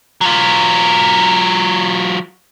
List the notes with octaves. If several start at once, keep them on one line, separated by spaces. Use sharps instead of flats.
F#3 F4